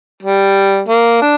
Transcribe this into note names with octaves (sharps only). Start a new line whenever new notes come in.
G3
A#3
D4